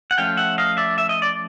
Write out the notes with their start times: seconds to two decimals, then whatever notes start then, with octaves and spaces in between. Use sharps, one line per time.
0.11 F#5
0.18 F3 A3 C#4 F5 G5
0.37 E5 F#5
0.58 D#5 F5
0.77 D5 E5
0.98 E5
1.09 D#5
1.22 D5